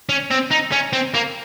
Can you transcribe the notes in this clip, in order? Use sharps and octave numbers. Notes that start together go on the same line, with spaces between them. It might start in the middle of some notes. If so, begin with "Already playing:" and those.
C#4
C4
D#4
C#4
C4
A#3